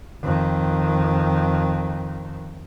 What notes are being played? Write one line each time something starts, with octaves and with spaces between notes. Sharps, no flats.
F2 D#3